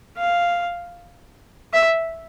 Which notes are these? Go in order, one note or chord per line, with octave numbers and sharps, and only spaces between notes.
F5
E5